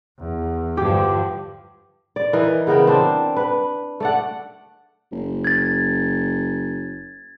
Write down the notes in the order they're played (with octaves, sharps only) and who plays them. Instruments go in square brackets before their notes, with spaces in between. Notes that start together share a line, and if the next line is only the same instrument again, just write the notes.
[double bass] E2
[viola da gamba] G2 D3 F3 [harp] G4
[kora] D5
E3 A#4 D#5
C#3 B3 A#4 G5
C4 D4
B4
A3 D5 F#5
[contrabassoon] F#1
[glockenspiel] G#6 A6